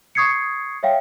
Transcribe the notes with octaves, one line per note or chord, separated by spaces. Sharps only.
C#6 D#6 G#6 C7 C#7
C#5 E5 F5 G5